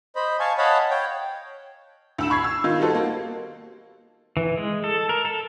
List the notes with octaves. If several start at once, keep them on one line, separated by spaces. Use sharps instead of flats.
C5 D#5 B5
F5 G#5 A5 C#6
C#5 D#5 F5 F#5 A5 B5
C#5 G5
D2 E6 E7
B5 C#6 G#6 C7
E6
D#3 F4
G3 D#4 F#4 A4 C5
A#3
E3
G#3
A4
A#4
A4